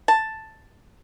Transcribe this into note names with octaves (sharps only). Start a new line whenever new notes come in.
A5